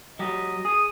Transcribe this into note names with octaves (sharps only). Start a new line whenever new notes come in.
F#3 G4 D#5
G#4 D#6